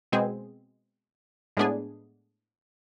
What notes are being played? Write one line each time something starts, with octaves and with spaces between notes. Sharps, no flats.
B2 G#3 C4 G#4
A2 G#3 B3 D4 G#4